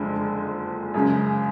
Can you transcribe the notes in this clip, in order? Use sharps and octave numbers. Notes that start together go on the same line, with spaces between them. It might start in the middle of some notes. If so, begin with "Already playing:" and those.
Already playing: F#1 F2 D3 G#3 D4
F#2 C#3 G#3